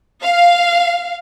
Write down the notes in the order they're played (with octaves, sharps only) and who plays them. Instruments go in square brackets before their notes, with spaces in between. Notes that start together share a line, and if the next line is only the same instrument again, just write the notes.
[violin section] F5